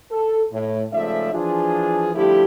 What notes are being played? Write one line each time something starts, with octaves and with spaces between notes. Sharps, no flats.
A4
A2
G#2 C#3 F3 A3 D5 E5
E3 F3 D4 F4 G#4
D3 F3 G3 A3 E4 G4